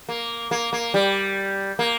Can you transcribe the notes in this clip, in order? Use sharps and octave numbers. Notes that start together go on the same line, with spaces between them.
A#3
A#3
A#3
G3
A#3